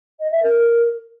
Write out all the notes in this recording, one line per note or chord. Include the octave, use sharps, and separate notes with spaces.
D#5
E5
A#4